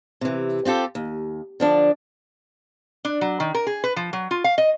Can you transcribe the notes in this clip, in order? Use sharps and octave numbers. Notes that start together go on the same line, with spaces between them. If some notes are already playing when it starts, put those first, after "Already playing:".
C3 E3
C4 F4 G4 A4
D#2
D3 F3 D4
D4
F#3
D#3
A#4
G#4
B4
F3
F#3
F4
F5
D#5